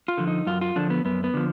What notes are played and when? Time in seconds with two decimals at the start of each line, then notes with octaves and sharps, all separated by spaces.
0.08 F4
0.17 D3 F3
0.27 D#4
0.47 F#2 F4
0.61 F4
0.76 D3 F3 D4
0.90 B3
1.05 F#2 B3
1.24 B3
1.34 D3 F3